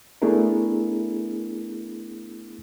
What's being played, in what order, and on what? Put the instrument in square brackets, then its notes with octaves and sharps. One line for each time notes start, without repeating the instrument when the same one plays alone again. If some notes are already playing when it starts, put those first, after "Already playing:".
[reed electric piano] A3 B3 D4 E4 G#4 A#4